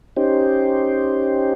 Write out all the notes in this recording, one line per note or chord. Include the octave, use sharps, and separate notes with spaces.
C#4 D#4 G4 C5